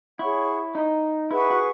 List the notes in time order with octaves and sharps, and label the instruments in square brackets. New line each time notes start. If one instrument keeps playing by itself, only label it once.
[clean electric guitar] E4 [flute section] G#4 C#5 F#5 C#6
[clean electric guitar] D#4
[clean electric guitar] E4 [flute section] G#4 B4 F#5 C#6
[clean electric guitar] F#4